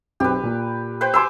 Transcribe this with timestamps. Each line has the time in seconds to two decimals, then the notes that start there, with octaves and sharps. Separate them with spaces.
0.20 B1 C4 G4 B4
0.43 A#2
1.01 B4 C5 G5
1.14 B4 G#5 C6 D6 E6